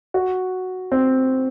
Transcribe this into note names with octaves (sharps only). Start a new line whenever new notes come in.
F#4
C4